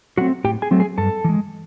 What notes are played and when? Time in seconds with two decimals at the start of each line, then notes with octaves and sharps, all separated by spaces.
0.17 F#3 A3 C4 F#4 F#5
0.44 A2 G4 G5
0.62 G#4 G#5
0.71 F#3 A3 C4
0.80 G#4 G#5
0.98 G2 A4 A5
1.24 E3 G#3